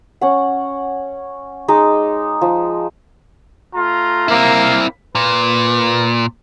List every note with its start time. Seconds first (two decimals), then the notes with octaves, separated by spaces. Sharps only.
0.21 C#4 F#5
1.68 G#3 D#4 D#5 D6
2.41 F3
3.73 A3 F4 A#5
4.28 A#3 C4 E4
5.15 A#2 B4